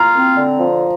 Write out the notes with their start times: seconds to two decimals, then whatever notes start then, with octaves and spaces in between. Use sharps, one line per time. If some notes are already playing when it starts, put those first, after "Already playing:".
Already playing: F4 A#5
0.14 C4
0.36 D3
0.59 F3